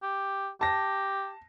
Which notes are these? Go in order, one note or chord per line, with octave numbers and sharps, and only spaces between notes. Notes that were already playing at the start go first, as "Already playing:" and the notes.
G4
G4 A5 A#6